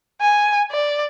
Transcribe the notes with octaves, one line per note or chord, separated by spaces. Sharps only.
G#5
D5